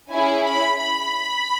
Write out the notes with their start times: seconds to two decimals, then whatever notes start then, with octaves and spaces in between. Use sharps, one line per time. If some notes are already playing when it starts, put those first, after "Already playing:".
0.11 C#4 E4 G#4 G#5
0.44 B5
0.78 B5